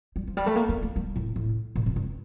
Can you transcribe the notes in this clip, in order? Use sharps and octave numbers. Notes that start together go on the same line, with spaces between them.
G3
F3
G3
A3
A#3
A#3
A3
G3
A2
A2
A#2
F2
G2